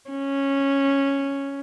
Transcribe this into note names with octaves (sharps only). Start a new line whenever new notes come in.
C#4